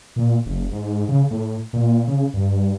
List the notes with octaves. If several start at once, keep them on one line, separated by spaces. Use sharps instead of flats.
A#2
F#1
G#2
C#3
A2
A#2
C#3
G2
G2